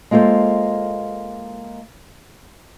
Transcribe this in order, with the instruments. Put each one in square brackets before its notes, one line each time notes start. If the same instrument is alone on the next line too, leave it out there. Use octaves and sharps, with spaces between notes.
[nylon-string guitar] G#3 A#3 F4 A4 C5